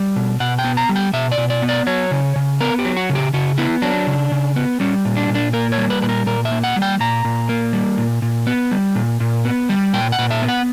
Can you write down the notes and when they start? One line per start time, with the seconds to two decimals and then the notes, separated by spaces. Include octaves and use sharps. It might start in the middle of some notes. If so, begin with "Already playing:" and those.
Already playing: G3
0.16 B2
0.40 B2 F#5
0.59 G5
0.64 B3
0.77 A#5
0.89 G3
0.96 G5
1.13 B2 E5
1.32 D5
1.38 B2
1.50 D5
1.62 B3
1.69 D5
1.87 F#3 C#5
2.11 C#3
2.36 C#3
2.60 B3 A#4
2.79 G4
2.85 F#3
2.97 F#4
3.09 C#3
3.15 G4
3.33 C#3 F#4
3.58 B3 E4
3.82 F#3 D4
4.07 C#3
4.32 C#3
4.56 B3
4.80 G3 C#4
5.05 A#2
5.17 D4
5.29 A#2
5.35 D4
5.53 A#3 A#4
5.72 C#5
5.78 G3
5.90 B4
6.02 A#2 B4
6.09 A#4
6.26 A#2 A#4
6.45 E5
6.51 A#3
6.63 F#5
6.76 G3
6.82 G5
7.00 A#2 A#5
7.25 A#2
7.49 A#3
7.73 G3
7.98 A#2
8.22 A#2
8.47 B3
8.71 G3
8.95 A#2
9.20 A#2
9.45 B3
9.69 G3
9.93 A#2 G5
10.12 F#5
10.19 A#2
10.31 E5
10.42 B3
10.48 F#5